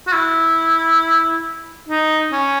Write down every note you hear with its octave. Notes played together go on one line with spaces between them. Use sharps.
F#4
E4
D#4
C#4